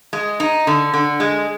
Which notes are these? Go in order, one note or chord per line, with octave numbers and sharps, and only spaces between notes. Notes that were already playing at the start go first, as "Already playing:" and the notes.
G#3
D#4
D3
D3
G#3